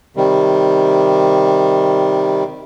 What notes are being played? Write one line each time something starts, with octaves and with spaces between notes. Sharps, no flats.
C3 D#3 G3